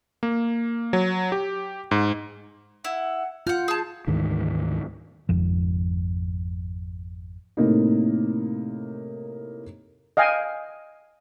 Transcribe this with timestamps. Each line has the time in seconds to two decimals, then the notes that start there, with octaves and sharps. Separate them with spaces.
0.23 A#3
0.93 F#3
1.32 G4
1.91 G#2
2.84 E4 F#5
3.47 F4 F#5 F6 G6
3.68 G#4 A5
4.07 D2 G#2 D#3 E3
5.29 G#1 F2 F3
7.57 A2 C3 A#3 D#4
10.17 D#5 F5 G5 G#5